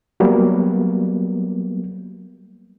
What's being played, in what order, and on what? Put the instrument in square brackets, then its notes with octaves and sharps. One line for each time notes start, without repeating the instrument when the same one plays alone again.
[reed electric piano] F#3 G3 A#3 B3